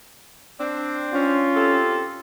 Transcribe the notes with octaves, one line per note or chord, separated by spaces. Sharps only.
C4 D4
C#4 F4
C4 G4 A4